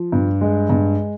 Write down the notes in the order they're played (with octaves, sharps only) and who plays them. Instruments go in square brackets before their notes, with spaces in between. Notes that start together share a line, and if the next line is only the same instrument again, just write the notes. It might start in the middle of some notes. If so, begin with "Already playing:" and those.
Already playing: [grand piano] F3
G2
G#3
G2